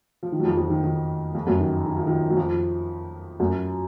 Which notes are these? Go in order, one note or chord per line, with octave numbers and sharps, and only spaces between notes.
F3
D#3
F#3
F2 F3
F2 F3
D#3
D#3
F2 F3
F#2 F#3
D#3
D#3
F3
D#3
F#3
F2 F3
F#2 F#3